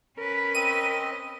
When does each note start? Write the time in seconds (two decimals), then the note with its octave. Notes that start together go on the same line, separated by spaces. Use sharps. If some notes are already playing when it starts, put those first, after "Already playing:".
0.18 C#4 A#4 B4
0.55 C4 D#5 D#7